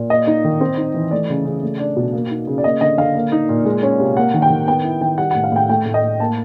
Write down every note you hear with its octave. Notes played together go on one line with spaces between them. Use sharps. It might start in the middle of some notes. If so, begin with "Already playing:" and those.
Already playing: A#2
A#3 D#5
D#4
D#3
C4
D#4
E3
A3 D5
C#3
C#3
A3
D4
B2
A#3
D#4
C#3
D5
A#3 D#5
D3 D#5
D3 F5
A#3
D#4
A#2
G#3
C#4
C3
A#3 F#5
D#3
G5
D#3
B3 G5
E4
D#3 G5
G3 F#5
A2 F#5
F5
A2 G5
A3 G5
A2
D#5
A2
A#3 A5